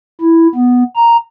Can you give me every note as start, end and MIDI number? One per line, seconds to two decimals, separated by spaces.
0.21 0.47 64
0.55 0.83 59
0.96 1.17 82